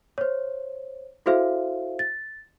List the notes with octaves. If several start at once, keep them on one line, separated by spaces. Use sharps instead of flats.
C5 C#5
E4 F#4 A4 C5 E5 F5
A6